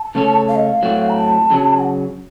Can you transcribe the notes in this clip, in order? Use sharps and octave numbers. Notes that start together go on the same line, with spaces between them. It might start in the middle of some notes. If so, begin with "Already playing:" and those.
Already playing: A5
C#3 A3 C#4 A4 C#5
F5
D#5
F5
A2 F#3 A3 C4 F#4
A#5
A5
F#2 C#3 F#3
F#5